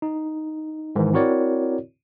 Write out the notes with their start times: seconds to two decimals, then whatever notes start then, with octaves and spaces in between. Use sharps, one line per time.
0.02 D#4
0.96 G#2 D#3 E3
1.14 C4 E4 F#4 A#4 C#5 D5